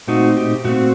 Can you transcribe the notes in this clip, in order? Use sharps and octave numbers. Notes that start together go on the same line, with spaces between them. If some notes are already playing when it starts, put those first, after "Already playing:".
A#2 A3 C4 D#4 F#4
G4
A#2 A3 C4 F#4